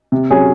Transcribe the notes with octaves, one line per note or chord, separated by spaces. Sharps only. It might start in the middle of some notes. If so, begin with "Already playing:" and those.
C3
F#3 C#4 G#4 C#5